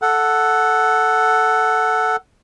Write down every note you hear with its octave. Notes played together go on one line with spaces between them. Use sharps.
A4 F#5